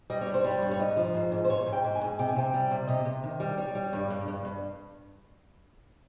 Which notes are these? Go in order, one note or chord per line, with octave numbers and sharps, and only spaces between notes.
G3 D#5
C#5
G2
C5
G3 C#5
G2
C#5
G#2 D#5
F3
G#2
G#2
C5
G#2 C#5
G#2
G5
G#2
G#5
G#2
C3 G5
G#5
C3 G5
G3
C3
C3 D#5
C3
D#3
G3
G3 C#5
G3
G2
G2
G2
G2